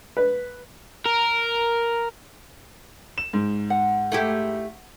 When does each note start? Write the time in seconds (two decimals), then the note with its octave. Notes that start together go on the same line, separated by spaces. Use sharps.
0.17 B4
1.05 A#4
3.18 E7
3.33 G#2
3.70 F#5
4.12 A3 E4 G4